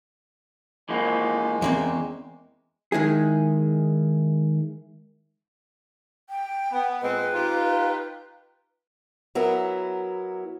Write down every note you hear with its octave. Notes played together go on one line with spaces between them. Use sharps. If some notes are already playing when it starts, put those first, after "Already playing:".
E3 F3 G#3 A#3
E2 C#3 A#3 C4
D#3 G#3 E4 G#4
G5
B3
A#2 G#3 C4 B4
D#4 F4 G4
F#3 B3 E4 A#4